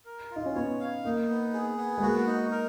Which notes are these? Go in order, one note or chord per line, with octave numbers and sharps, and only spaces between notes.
A#4
F4
D#4
C#4
B3 C#5
F5
A#3 D#4
B3
G#4
B3
G#3
A#3 F#4
D#4
A#4